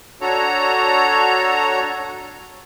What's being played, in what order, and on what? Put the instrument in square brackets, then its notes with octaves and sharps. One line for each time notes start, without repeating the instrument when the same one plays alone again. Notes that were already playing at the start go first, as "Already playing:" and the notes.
[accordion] D4 F#4 A4 C#5 A#5